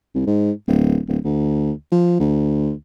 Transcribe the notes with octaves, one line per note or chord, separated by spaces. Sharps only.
C2
G#2
D1
D1
D2
F3
D2